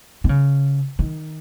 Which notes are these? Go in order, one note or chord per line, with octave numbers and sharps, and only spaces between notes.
D#3
C#3
D#3